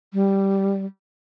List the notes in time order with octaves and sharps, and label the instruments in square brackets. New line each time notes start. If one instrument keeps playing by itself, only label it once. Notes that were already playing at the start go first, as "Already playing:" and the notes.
[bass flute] G3